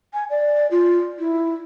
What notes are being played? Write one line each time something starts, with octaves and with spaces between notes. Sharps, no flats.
G#5
D5
F4
E4